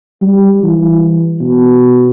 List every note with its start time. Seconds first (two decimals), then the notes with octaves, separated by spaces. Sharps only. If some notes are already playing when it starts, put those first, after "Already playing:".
0.21 G3
0.63 E3
1.40 B2